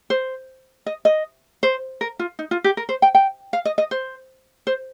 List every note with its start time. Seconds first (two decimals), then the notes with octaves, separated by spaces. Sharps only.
0.10 C5
0.86 D#5
1.05 D#5
1.63 C5
2.01 A#4
2.19 F4
2.39 D#4
2.51 F4
2.64 G4
2.77 A#4
2.89 C5
3.02 G5
3.15 G5
3.53 F5
3.65 D#5
3.78 D#5
3.91 C5
4.67 C5